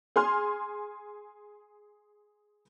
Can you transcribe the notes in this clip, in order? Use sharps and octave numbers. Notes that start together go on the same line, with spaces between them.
G#4 G#5 C6 F6